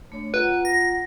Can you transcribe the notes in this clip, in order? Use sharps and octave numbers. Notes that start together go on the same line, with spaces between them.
A3 D4 C#5
F4 B4 F#5 A#5
A#6